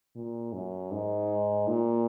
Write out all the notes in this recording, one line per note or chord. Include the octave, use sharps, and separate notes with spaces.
A#2
F#2
G#2
A#2